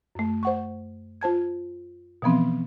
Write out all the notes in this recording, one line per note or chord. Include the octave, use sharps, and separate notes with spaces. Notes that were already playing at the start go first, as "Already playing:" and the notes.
F#2 A3
C5 F#5 C#6
F4 C5 A5 G#6
B2 E3 F3 B3 C4